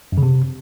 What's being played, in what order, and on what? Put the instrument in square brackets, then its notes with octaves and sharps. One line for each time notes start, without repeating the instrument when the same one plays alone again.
[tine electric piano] F#2
C#3
C3